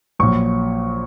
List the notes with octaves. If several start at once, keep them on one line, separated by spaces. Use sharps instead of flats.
A#1 A#2 F#3 C#6